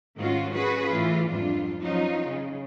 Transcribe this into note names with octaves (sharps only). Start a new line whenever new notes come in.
G#2 D#3 C#4 F4 F#4
C#4 F#4 G#4 B4
A2 E3 F4
F2 G#2 G3 D4 F4
F3 F#3 C#4 D#4 F4
C#3